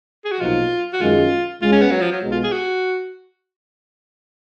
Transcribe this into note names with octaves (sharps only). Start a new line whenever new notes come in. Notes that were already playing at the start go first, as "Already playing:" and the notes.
G#4
F#4
B1 A#2 F3 A#3 D#4 F4
F#4
F#2 D#3 G#3 F4
C#2 C#3 G#3 F4
C#4
B3
F#3
F3
F#3
B1 B2 G#3
F4
G#4
F#4